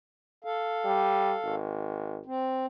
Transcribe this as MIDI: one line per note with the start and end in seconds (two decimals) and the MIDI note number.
0.44 1.55 69
0.44 1.55 77
0.85 1.34 55
1.44 2.20 32
2.26 2.66 60